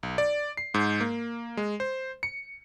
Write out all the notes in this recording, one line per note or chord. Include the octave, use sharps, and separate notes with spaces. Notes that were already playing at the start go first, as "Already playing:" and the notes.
B1
D5
C7
G#2
A#3
G#3
C5
C#7